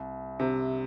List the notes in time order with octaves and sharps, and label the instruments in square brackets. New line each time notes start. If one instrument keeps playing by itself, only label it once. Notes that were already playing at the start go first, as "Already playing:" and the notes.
Already playing: [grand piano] C2
[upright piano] C3